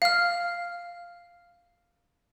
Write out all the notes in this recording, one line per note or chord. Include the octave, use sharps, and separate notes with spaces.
F5 F6